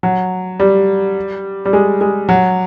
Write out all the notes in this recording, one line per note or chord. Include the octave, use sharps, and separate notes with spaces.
F#3
G3
G3
G#3
G#3
F#3